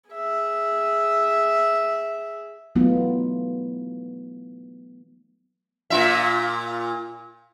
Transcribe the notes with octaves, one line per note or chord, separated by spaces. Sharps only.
G#4 E5
E3 F#3 A3 B3 D#4 F4
A#2 F4 E5